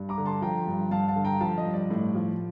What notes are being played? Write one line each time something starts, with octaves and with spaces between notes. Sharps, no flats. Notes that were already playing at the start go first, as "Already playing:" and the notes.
Already playing: G2
A#5 D6
D3
A5 C6
F3 G5 A#5
G2
G2 F5 A5
F5 A5
D3
G5 A#5
F3 F5 A5
D#5
G2
D5
A2
F3